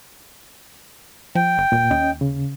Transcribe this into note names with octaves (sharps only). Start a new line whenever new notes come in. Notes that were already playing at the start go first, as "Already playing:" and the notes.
F3 G5
G1
E1 A#2
D#2 C#4 D#5
C#3